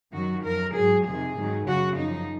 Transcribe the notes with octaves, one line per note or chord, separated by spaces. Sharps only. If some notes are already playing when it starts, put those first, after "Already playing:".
F#2 D#3 F#3 F#4
F#2 F3 A#4
G#2 F#3 G#4
F2 C3 D#3 G#4
G#2 D#3 F#3
F#2 C#3 F#3 F#4
F#2 F3 D#4